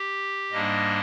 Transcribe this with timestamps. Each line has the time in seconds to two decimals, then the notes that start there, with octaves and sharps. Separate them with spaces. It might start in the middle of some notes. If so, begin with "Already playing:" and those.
Already playing: G4
0.52 G#2 G3 A#3 D4 D#5